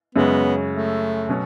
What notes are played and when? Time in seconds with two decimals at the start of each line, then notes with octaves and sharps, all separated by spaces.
0.15 F#2 C#3 G#3 B3 C#4
0.71 A3
1.29 B2 F#3 C#4